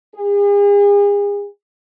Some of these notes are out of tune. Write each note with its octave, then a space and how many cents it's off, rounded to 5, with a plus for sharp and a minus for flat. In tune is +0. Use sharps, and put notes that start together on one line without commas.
G#4 -40